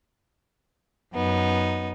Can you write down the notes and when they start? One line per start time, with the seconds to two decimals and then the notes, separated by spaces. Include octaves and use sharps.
1.12 F#2 B3 D#4